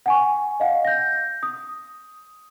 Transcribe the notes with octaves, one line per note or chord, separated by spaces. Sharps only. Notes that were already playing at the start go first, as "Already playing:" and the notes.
F#5 G#5 C#6
D#5 F5 F#5
G6 A#6
D#6